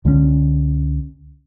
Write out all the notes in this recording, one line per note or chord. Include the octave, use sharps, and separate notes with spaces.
C#2 D3 F3 C#4